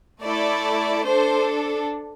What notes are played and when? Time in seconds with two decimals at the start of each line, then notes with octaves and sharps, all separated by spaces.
0.22 A3 E4 A4 D5
1.04 D4 A4 C5